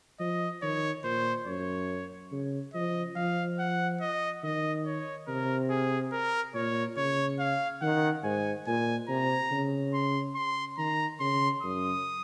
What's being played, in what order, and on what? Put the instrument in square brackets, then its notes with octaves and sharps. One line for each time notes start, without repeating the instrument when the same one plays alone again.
[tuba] F3 [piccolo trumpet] D#5
[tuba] D#3 [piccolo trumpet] C#5
[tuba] A#2 [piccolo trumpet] C5
[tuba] F#2 [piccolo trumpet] C#5
[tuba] C#3
[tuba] F3 [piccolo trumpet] D#5
[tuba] F3 [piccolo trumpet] F5
[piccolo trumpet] F#5
D#5
[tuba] D#3 [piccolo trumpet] D#5
[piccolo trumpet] C#5
[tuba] C3 [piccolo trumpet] A#4
[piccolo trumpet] G#4
A#4
[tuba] A#2 [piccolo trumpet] C#5
[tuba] C#3 [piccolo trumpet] C#5
[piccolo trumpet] F5
[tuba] D#3 [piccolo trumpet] F#5
[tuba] G#2 [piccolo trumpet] G#5
[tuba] A#2 [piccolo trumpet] G#5
[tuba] C3 [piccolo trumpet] A#5
[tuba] C#3
[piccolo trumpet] C6
C6
[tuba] D#3 [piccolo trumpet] A#5
[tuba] C#3 [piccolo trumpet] C6
[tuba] F#2 [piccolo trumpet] D#6